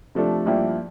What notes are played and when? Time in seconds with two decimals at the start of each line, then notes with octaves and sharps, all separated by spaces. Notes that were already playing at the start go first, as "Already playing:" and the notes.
0.15 C3 F3 A3 D4 A4
0.46 G2 F3 A#3 E4 G4